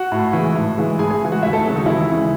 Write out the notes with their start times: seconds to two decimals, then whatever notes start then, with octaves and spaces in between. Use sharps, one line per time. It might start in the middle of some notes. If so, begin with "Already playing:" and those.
Already playing: F#4 F#5
0.12 A2
0.33 E3 G#3
0.55 A2
0.77 E3 G#3
0.99 A2 G#4 G#5
1.11 G#4 G#5
1.21 E3 G#3
1.32 F#4 F#5
1.43 D#2 E4 E5
1.53 A3 A4
1.64 C#3 F#3 G#3 F#4
1.75 D#3 D#4
1.86 D#2 E3 E4
2.07 C#3 G#3